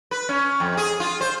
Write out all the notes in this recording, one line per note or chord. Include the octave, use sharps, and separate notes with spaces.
B4
C#4
F2
G#4
F4
C5